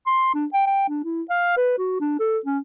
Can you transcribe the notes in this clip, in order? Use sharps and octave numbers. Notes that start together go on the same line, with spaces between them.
C6
D4
G5
G5
D4
E4
F5
B4
F#4
D4
A4
C#4